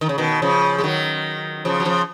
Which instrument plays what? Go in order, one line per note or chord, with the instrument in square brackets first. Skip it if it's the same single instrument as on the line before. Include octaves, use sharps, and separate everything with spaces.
[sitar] D#3
C#3
B2 D#3
C#3 F3
G#3
D#3 F#3
C#3 F3
F#3
C#3 F3